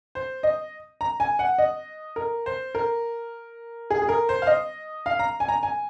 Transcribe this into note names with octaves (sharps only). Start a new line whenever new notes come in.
C5
D#5
A#5
G#5
F#5
D#5
A#4
C5
A#4
G#4
G#4
A#4
C5
F5
D#5
F5
A#5
G#5
A#5
G#5